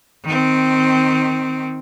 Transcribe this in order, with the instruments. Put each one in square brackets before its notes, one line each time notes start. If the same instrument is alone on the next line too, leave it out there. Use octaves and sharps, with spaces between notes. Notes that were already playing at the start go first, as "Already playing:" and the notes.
[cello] D#3 C4